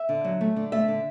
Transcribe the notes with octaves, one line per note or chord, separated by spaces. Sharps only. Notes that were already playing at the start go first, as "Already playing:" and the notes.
Already playing: E5
D3
F#3
A3
D3
A3 E5
D3